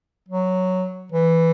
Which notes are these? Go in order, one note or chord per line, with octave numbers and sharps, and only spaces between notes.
F#3
E3